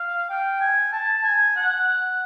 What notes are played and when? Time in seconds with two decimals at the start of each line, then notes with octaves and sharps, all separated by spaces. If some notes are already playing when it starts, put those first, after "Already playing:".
Already playing: F5
0.29 G5
0.61 G#5
0.93 A5
1.24 G#5
1.56 F#5
1.87 F#5